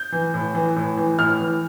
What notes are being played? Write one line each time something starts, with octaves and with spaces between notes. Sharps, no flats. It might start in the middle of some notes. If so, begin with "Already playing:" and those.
Already playing: G6
E3
A2
E3
A2
E3
A2 F6
E3